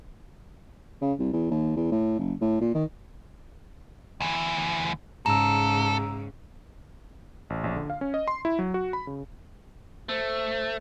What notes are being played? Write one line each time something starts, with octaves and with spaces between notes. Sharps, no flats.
C#3
C2
E2
D#2
E2
A2
F#1
A2
A#2
D#3
D2 E3
G#2 C#3 A4 A#5 E6
A1
A#1
D3
F5
C#4
D#5
C6
E4
F#3
F#4
B5
C#3
A3 C5